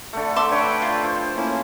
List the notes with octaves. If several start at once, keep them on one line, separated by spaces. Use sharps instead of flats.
D3 A3
E5 C6 D6
D4 B4 C#5 G5
F4
F3 C5
A#3 C#4 E4